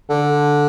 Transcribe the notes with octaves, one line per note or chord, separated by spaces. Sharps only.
D3